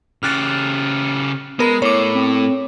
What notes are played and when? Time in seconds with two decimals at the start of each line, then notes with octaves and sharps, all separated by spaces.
0.23 C#3 G4 F6 F#6 A6
1.59 G#3 B3 A#4 B5
1.82 A2 C#5 D6
2.14 C4